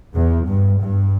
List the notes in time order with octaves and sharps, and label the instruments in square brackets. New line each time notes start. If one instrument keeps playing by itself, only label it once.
[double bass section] E2
G2
G2